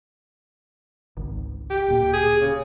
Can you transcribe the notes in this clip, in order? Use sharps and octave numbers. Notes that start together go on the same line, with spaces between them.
G#1 C#2
G4
D1 A#2
G#4
C#3